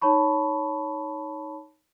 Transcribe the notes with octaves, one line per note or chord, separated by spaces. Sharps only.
D#4 C#5 A5 B5 C#6